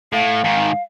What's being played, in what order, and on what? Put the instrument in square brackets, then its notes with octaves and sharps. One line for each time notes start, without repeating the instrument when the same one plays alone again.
[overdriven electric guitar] A2 [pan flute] F5
[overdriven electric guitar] G#2 D#3